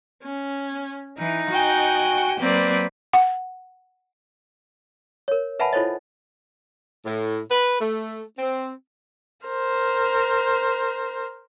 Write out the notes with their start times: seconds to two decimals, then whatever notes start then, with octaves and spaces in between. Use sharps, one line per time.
0.23 C#4
1.18 E3 D#4
1.51 F#4 G5 G#5
2.41 F#3 A#3 C4 B4 D5
3.13 F#5
5.28 A#4 C#5
5.60 B4 E5 F#5 G#5 A5 B5
5.73 E4 F4 A4 C5 C#5 D#5
7.06 A2
7.51 B4
7.80 A3
8.39 C4
9.47 A#4 C5